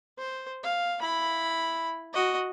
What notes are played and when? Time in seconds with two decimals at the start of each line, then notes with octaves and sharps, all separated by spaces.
0.18 C5
0.64 F5
1.01 E4 B5
2.13 F#4 D#5